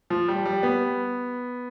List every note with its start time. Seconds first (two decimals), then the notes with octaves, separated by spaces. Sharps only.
0.10 F3
0.28 G3
0.46 G3
0.63 B3